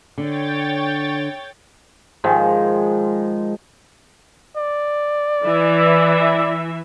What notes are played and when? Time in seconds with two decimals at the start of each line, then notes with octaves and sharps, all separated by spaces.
0.18 D3 C#5 G5 A6
2.24 G#2 D#3 F3 G#3
4.57 D5
5.45 E3 E5